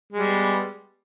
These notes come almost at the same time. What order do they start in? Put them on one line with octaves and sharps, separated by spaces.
G#3 G3 B3